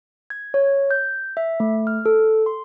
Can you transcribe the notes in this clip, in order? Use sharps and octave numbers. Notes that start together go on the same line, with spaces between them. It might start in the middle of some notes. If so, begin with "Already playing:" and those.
G#6
C#5
G6
E5
A3
F6
A4
C6